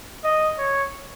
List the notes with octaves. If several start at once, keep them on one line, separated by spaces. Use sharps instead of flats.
D#5
C#5